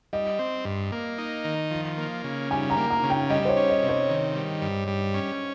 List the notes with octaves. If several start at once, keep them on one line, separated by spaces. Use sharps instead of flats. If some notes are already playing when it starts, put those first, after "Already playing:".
G3 D#5
C4
G2
A#3
D#4
D#3
F3
A#3
C#3
G3 G#5
A#5
A#3
A#5
C#3
G5
G3 D#5
C5
C#5
C#4
D#5
C3
C#5
D#3
G3
G2
G3
C#4